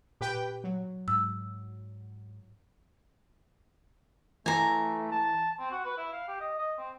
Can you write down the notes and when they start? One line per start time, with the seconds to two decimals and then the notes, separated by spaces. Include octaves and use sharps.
0.21 A#2 G4 B4 G5
0.64 F#3
1.08 G#2 E6
4.46 E3 A3 G#5 A#5
5.12 A5
5.59 C4
5.71 F#4
5.85 B4
5.97 E4
6.13 F5
6.28 G4
6.40 D#5
6.59 D#5
6.78 C4